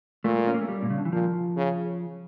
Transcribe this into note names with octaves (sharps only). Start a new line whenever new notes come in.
A#2 A3
C#4
A#3
A3
G3
A#2
C#3
D3
E3
A#2 F3
C#3